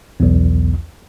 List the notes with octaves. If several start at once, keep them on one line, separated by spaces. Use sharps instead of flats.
B1 E2